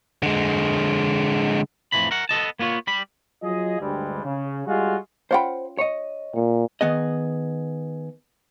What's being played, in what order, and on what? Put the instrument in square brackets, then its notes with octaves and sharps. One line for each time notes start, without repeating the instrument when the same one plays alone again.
[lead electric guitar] D3 G#3
[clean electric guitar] F2 A2 C#3 E3 F3 B5
A#4 F#5
B3 A4 D#5 A5
A#3 B3 F4 C#5
G3 B5
[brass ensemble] F#3 F4 G#4 D#5
D2 G2 G3 G#3
C#3
G3 G#3 F4 F#4 G#4
[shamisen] C#4 F4 G5 [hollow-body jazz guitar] C5 F#5 B5
[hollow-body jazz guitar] C#5 D#5
[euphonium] A#2
[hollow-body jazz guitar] D#3 B3 G#4 D#5